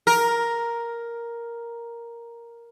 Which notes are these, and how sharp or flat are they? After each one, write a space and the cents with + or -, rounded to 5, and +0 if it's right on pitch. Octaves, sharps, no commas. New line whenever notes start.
A#4 +5